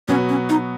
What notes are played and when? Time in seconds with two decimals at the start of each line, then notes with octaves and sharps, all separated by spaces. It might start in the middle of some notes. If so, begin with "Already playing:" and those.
0.08 B2 F#3 B3 C#4 F#4
0.29 C#4
0.49 D#4